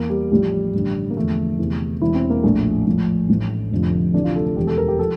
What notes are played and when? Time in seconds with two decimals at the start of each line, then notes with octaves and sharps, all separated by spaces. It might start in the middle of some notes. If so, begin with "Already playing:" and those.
Already playing: E2 E3 A#3
0.10 G3
0.31 A1 A2 F3 G3
0.74 A1 G2 D3
1.10 A#3
1.16 E2 D3 F3 A3
1.59 E2 C3 E3
2.02 E1 E2 E3 E4
2.15 C4
2.30 A#3
2.43 A#1 A2 F3 A3
2.87 A#1 A2 F3
3.29 A1 A2 E3
3.71 F1 F2 D3 F3
4.14 D2 C3 E3 D4
4.24 F4
4.35 A4
4.46 A4
4.57 E1 E2 E3 G4
4.67 A4
4.78 A#4
4.88 G4
4.99 F3 A4